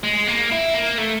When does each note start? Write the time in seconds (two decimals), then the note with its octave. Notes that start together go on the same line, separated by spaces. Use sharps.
0.04 G#3
0.27 A#3
0.52 E4
0.74 A#3
0.98 A3